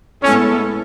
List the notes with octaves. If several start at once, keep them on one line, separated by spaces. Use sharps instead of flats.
A2 G#3 B3 C#4 E4 A4